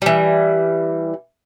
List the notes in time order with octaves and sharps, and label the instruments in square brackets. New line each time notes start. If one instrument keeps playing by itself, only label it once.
[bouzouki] E3 G3